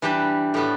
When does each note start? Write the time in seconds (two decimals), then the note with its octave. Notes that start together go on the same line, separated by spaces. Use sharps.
0.02 E3 G3 D4 G4 B4
0.54 A2 G3 B3 F#4 A4